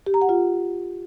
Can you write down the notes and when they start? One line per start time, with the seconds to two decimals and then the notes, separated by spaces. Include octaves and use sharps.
0.06 G4
0.14 A#5
0.21 F#5
0.29 F4